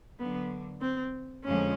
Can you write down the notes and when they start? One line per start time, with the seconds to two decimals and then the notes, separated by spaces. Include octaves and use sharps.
0.19 D3 F#3 A#3 B3
0.81 C4
1.44 F2 D3 F3 G#3 C#4